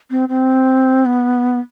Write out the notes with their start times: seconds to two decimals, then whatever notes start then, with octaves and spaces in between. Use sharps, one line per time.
0.11 C4
0.29 C4
1.05 B3